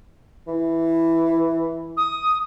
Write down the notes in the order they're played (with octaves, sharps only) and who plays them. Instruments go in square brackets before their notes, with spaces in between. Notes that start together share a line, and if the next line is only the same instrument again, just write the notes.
[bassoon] E3
[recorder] D#6